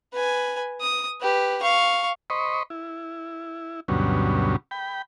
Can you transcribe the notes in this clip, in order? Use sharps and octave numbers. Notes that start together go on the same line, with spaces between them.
B4 G#5
D#6
G4 B4
F5 C#6
C5 D#5 B5 C#6
E4
D2 G2 B2 F#3 C#4
G5 B5